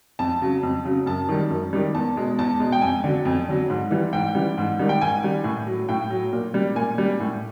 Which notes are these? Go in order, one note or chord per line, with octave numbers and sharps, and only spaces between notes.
F2 A5
C#3 F#3
F2
C#3 F#3
F#2 A5
D#3 G3
F#2
D#3 G3
E2 A5
B2 G#3
E2 A5
B2 G#3
G5
F2 G#5
D3 F#3
F2
D3 F#3
G#2
E3 G3
G#2 G5
E3 G3
G#2
D#3 G3
G5
G#2 G#5
D#3 G3
A2
F#3
A2 G5
F#3
A#2
G3
A#2 G#5
G3
A2